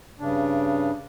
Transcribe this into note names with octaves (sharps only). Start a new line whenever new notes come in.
G2 C#3 D4